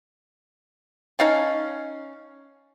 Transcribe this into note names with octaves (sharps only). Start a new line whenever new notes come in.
C#4 D#4 F5 A5